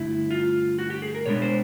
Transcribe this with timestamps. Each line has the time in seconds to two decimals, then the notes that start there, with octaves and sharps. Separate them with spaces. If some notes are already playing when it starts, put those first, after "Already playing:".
Already playing: G2 D3 F#3 A3 E4
0.31 F4
0.79 F#4
0.90 G4
1.02 G#4
1.15 A#4
1.26 B2 G#3 B3 D4 C#5
1.42 C5